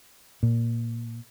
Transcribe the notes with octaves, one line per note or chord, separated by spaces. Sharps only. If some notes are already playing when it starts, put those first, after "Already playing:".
A#2